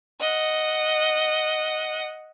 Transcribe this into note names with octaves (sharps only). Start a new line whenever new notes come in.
D#5 F#5